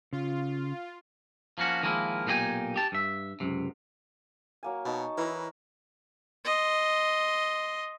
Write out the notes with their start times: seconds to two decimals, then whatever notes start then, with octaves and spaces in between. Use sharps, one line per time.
0.13 C#3 F4
1.58 F3 A#3 C#4 F#4
1.83 D#3 F3 G#3 A#3 E4
2.26 B1 A#2 D#4 F4 G4 G#5
2.76 G4 A5
2.92 G2 E5
3.40 C#2 F#2 C3
4.63 F#3 A#3 G#5
4.85 B2 D#4 C#5 A5
5.17 E3 E4 A#4
6.45 D#5 C6